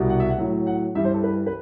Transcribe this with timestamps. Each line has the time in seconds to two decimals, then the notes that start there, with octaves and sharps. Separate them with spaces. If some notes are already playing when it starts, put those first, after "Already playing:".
Already playing: C2 B2 G3
0.10 F#5
0.20 E5
0.29 F#5
0.38 A2 F#3
0.67 F#5
0.95 G2 E3 G3 E5
1.04 C5
1.14 A4
1.23 B4
1.46 B4